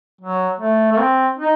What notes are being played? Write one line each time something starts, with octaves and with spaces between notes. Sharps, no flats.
F#3
A3
A3
C4
D#4